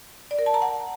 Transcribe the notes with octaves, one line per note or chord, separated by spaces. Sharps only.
D5
A#4
A5
A#5
F#5